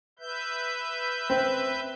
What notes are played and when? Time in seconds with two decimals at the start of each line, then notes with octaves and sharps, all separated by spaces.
0.19 B4 E5 G6
1.30 C4